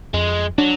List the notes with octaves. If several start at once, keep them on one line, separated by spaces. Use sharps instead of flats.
F2 G#3
F#3 D4